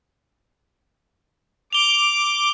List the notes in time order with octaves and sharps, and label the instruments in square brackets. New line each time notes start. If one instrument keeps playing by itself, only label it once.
[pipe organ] D6 [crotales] F7 G7